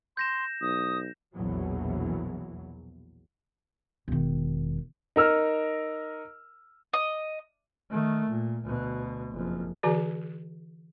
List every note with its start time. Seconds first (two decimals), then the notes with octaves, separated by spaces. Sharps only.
0.17 C6 G6 A#6 E7
0.62 B1 D#6
1.36 A#1 E2 B2 E3 F#3
4.08 E1 D#3
5.16 D#4 A#4 E6 F6
6.93 D#5
7.91 D#3 A3
8.30 A#2
8.64 D2 B2
9.31 F#1 F2
9.83 D3 E3 F#4 G#4 D5